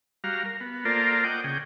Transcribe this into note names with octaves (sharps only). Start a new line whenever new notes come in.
G3 F#4 F5 A#5
A#4
B3
A#3 F4 A4 A#4 C5 D5
D#5 F#5 G5 D6
C#3 G#4 G5